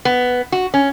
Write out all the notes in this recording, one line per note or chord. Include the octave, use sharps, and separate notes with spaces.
B3
F#4
C#4